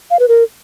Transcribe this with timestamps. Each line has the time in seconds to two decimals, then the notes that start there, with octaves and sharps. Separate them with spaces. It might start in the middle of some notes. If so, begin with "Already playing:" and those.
0.10 F5
0.19 B4
0.28 A#4